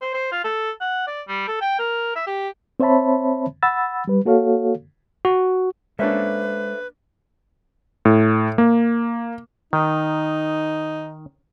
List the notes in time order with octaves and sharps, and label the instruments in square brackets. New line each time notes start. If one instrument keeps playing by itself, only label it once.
[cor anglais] C5
C5
F4
A4
F#5
D5
G3
A4
G5
A#4
E5
G4
[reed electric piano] C4 C5 C#5 E5 A5 B5
F#5 B5 E6 A6
G3 B4
A#3 F#4 A4 C#5 F5
[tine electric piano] F#4
[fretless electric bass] G#3 [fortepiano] A#3 C#4 D4 [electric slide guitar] A4 C5 E5 [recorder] B4
[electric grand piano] A2
A#3
[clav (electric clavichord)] D#3 [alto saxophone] D#4